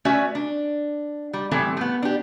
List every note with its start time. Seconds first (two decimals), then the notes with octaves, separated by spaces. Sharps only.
0.05 A3 C#4 F#4 B4 D5 E5
0.35 D4
1.33 G3
1.51 A2 E3 G3 C4 E4 A4
1.77 A3 B3
2.02 D4 G4